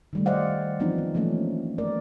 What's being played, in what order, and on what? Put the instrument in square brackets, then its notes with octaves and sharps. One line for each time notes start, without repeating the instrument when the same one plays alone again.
[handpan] D#3 G3 A3
C5 D5 D#5 F5 F#5
E3 F3 B3 C4 D4 D#4
D#4
E3 F3 A3 A#3 C#4
A3 A#4 D5